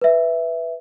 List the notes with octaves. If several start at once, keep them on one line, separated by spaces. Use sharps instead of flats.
B4 E5